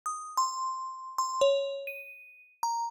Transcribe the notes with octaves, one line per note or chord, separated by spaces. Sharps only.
D#6
C6
C6
C#5
D#7
A#5